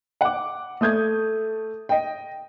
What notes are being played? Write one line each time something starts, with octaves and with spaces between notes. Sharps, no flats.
F#5 D6
A3 D#6 G6 G#6
D#5 G5